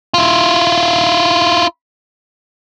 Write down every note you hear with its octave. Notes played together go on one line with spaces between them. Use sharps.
E4 F4